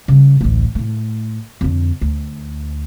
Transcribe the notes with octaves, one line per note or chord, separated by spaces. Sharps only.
C#3 G3
A1 D2
A2 A3
F2 D3
D2